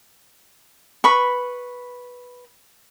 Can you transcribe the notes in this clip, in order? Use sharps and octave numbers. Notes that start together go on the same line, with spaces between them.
B4 B5 C#6